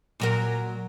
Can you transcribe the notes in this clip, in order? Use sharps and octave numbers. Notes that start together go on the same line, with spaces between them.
A#2 F#3 A#4